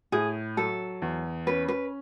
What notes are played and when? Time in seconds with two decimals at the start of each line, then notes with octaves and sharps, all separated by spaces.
0.12 A2 G#4
0.57 F#3 A4
1.02 E2
1.46 C#4 B4
1.68 B4